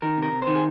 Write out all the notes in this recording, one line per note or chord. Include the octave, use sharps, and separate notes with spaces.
D#3 A#4
C3 A#4
C3
C5
D#3
G#4